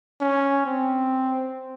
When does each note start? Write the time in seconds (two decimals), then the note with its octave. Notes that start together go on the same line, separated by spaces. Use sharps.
0.21 C#4
0.66 C4